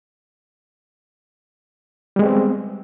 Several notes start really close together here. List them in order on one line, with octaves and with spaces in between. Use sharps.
G3 G#3 B3 C4